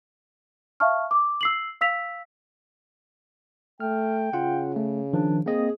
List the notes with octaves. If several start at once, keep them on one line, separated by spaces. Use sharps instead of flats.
E5 F5 A5 C#6 F6
D6
E6 C7 F#7
F5 E6 B6 F7
A3 G5 F6
C#3 F4 F#5
A3
D#3 F3 D4
A#3 C4 G#4 D#5